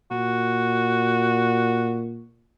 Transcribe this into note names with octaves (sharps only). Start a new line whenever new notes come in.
A#2 F#4